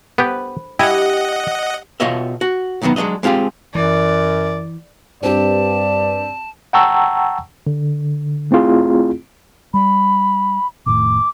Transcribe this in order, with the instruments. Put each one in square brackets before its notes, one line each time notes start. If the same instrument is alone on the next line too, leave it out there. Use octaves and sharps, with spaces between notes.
[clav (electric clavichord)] B3 G4 [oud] B4
[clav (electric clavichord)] E4 G#5 [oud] G4 [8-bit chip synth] D#5 F#5
[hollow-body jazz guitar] B2 F4 G4 C#5 D#5 E5
F#4
B1 E2 D#3 F#3 B3
F#3 G#3 A#3 D4 D#5
G#3 C4 F4 G4 G#4
[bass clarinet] F#2 [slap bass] E3 [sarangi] D5
[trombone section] G2 [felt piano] C4 G4 [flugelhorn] D5 [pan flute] A5
[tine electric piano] F#5 G5 A5 A#5 C#6 E6
D3
A3 C4 E4 F4 G#4
[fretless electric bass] G3 [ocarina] B5
[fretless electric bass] F1 A2 D#3 [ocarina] D6